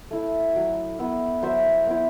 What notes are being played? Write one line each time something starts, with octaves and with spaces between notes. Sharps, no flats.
A3 E4
F#3
B3 E4
F#3 C5 E5
B3 E4